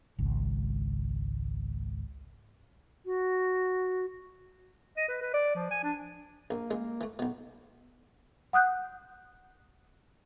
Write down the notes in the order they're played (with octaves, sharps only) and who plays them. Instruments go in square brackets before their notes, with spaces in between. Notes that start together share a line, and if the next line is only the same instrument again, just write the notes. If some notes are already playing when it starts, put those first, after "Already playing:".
[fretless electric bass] G#1 C#2
[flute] F#4
[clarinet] D#5
B4
B4
D5
F3
G#5
D4
[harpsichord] A#1 [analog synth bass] A#3
[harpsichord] A1 G#3
E3 A3
B1 B2
[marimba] F#5 D#6 F#6 G6